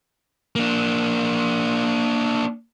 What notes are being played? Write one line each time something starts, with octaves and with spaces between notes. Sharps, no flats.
A#3 D4